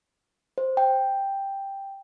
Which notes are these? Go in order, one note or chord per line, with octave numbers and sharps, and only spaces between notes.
C5
G5